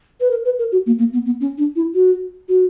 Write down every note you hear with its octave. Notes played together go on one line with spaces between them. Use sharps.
B4
A#4
B4
A#4
F#4
A#3
A#3
B3
B3
C#4
D4
E4
F#4
F#4